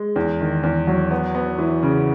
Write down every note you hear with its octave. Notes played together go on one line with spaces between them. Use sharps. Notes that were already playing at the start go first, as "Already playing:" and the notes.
Already playing: G#3
E2
D#3
E2
F#3
B3
B3
E3
C#3